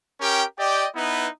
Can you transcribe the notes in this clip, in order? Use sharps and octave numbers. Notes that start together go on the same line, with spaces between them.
C#4 G4 A#4 G5
G4 D5 D#5 G5
B3 D#4 E4 B4